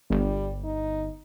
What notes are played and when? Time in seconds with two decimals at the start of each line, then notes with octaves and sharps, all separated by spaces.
0.10 G1 G3
0.64 D#4